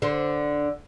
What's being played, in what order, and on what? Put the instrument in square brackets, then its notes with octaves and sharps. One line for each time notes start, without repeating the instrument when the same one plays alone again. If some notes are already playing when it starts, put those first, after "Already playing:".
[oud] D3 C5